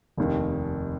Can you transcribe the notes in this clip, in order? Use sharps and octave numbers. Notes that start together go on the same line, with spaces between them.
F1 D#2 D#3